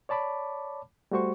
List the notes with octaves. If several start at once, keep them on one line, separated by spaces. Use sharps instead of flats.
C#5 D5 A5 B5 D6
G3 A3 F#4 C5 C#6